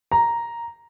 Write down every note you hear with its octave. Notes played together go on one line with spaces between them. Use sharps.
A#5